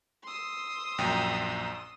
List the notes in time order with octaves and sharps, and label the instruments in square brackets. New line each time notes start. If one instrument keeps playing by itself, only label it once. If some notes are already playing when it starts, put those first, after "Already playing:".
[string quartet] C6 D#6 E6
[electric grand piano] A#1 F#2 G5